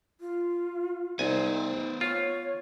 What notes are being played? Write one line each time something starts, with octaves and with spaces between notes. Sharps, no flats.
F4
C2 B3 D#4 C5 G#5
F4 C#5